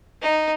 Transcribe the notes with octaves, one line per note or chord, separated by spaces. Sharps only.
D#4